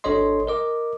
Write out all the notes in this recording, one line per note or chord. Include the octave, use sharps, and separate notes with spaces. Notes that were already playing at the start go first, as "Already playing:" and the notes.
G#1 D4 A4 C#5 D#5 C6
A#4 D#5 D6